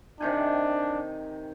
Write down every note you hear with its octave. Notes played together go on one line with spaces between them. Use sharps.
C3 D#3 D4 G#5